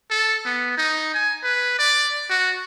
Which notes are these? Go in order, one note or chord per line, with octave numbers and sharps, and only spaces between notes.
A4
B3
D#4
G#5
B4
D5
F#4